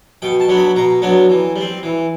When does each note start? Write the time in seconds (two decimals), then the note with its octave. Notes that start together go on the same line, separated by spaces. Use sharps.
0.22 B2 G5
0.40 A5
0.49 F#3 B3 D4
0.57 B5
0.76 B2 A#5
1.02 F#3 B3 D4
1.29 E3
1.56 G3
1.61 C4
1.83 E3